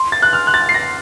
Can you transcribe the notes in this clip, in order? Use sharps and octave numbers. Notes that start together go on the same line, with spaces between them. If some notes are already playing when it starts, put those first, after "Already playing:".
Already playing: C6
A6
F#6
F6
F#6
A6
C7
A#6